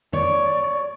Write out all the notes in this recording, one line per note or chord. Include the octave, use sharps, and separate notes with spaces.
C#5 D5